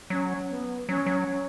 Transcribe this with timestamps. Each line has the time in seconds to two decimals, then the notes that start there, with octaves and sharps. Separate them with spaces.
0.10 F#3 C#4
0.50 B3
0.89 F#3 C#4
1.06 F#3
1.28 C#4